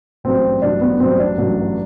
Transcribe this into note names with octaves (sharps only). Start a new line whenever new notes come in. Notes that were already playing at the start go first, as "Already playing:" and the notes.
A1 G2 F#3 C4
A1 G2 F#3 D4
B3
A1 G2 F#3 C4
D4
A1 G2 F#3